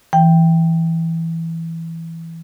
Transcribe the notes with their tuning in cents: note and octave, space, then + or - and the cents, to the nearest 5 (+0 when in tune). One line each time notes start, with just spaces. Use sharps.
E3 +0 G5 +0